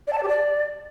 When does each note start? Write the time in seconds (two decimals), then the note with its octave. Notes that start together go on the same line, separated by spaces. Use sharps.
0.07 D5
0.12 A5
0.17 D5
0.23 G4
0.28 D5